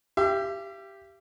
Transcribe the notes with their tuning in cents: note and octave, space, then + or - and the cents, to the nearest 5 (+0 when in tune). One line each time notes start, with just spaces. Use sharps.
G4 +0 E5 +45